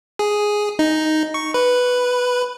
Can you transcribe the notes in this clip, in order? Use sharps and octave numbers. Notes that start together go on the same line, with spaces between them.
G#4
D#4
C#6
B4